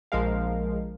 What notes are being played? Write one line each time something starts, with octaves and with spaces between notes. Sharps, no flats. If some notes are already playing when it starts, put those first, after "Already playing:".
A#1 F3 G#3 A#4 F5